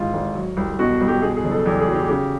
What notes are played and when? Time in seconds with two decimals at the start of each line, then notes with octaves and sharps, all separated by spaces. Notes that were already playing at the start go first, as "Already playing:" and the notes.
Already playing: G#1 G#2 E3 F4
0.14 G#1
0.35 F#3
0.57 C2
0.79 B2 F#4
1.01 C2
1.08 G4
1.22 B2 G#4
1.37 G#4
1.44 F#1
1.51 A4
1.66 E2 G4
1.80 G#4
1.88 F#3
1.94 G4
2.08 C#3 G4